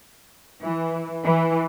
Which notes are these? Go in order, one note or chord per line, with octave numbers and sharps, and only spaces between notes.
E3
E3